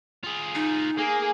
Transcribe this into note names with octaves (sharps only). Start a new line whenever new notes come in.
F4 G#4
D#4
A#3 G#4